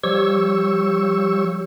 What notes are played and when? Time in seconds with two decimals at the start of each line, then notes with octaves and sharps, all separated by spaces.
0.04 F3 G3 G4 C#5 C#6 E6